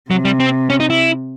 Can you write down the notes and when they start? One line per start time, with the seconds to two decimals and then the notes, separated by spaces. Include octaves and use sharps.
0.10 C3 F#3
0.25 G3
0.40 C4
0.70 C#4
0.80 D#4
0.90 E4